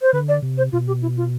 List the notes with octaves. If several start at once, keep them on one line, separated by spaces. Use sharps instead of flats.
C5
D3 B4
D5
C3
C5
B2 F4
G4
E4
F4